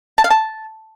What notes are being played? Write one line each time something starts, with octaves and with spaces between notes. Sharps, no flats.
A5
F5
A5